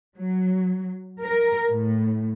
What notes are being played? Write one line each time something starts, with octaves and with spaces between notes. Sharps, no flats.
F#3
A#4
A2